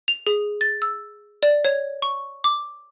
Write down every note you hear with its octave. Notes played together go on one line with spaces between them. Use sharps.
F7
G#4
A6
E6
D5
C#5
C#6
D6